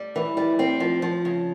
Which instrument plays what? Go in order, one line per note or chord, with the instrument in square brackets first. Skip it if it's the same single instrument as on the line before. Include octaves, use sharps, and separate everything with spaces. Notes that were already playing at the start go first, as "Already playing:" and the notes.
Already playing: [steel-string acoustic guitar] G3
E3
G3
C4
F3
F3
C#3